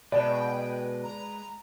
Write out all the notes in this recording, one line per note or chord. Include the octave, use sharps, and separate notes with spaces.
B2 G#3 B4 D5 G5 A5 E7
A#5